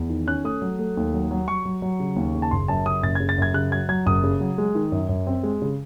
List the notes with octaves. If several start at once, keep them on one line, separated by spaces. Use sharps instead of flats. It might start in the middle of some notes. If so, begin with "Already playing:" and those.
Already playing: E2
D#3
C#4 F#6
A3 D#6
F#3
A3
D#2
F#3
F#3
F#3 C#6
F#3
F#3
C#3
D#2
C#3
A5
F#1 C6
F#2 A5
C#3 D#6
F#1 A6
C#3 G#6
A6
F#2 G#6
C#3 F#6
F#3 G#6
F#3 G#6
F#1 D#6
C#3
F#3
G#3
D#3
F#2
F#2
C4
G#3
C#3